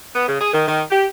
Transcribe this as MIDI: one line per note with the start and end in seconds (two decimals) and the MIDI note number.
0.14 0.27 59
0.28 0.40 49
0.40 0.50 68
0.53 0.64 51
0.67 0.83 51
0.91 1.06 67